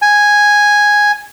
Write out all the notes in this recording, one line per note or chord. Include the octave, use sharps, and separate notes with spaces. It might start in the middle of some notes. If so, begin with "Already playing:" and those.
G#5